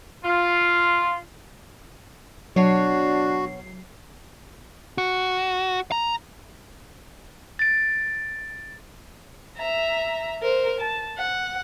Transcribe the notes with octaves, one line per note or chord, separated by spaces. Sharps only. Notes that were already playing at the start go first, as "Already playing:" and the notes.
F4
B2 F#3 D4 F#4 C#5 C7
F#4
A#5
A6 D7
E5 A#5
A#4 C5
A5
F#5